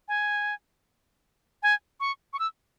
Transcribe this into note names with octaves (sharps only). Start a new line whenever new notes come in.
G#5
G#5
C#6
C#6
E6